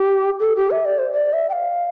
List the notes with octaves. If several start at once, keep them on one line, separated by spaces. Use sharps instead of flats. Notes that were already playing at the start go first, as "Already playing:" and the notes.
Already playing: G4
A4
G4
E5
D5
C5
D5
E5
G5
F5